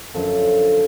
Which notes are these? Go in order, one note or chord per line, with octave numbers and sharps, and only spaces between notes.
F#2 D3 F3 A4